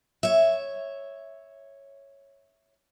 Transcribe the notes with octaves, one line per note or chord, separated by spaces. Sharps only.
C#5 E5